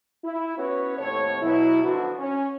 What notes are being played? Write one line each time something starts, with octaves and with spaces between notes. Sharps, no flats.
E4
B3 C#4 E4 F#4 B4 C#5
D#2 A2 A3 C4 C#5
B2 F#3 E4
D3 F3 B3 D#4 F#4
C#4